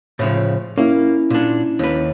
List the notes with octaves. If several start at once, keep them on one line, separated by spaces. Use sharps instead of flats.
A2 C#3 F3
A#3 C#4 E4
A#2 D4
D#2 B4